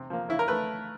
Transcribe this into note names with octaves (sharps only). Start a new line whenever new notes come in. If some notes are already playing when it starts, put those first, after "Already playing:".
Already playing: C3
F3 A#3
C#3 E4
A#4
A3 B4